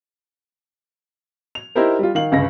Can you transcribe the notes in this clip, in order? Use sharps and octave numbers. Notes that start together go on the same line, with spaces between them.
F7
D#4 E4 G4 A#4 C5
G3 F4
D#3 F5 F#7
G1 C#2 C#3 A#6